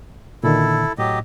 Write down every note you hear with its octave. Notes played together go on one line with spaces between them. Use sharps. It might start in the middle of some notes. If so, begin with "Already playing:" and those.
A#2 D3 D#3 E4 A4
A2 F#3 G4 D#5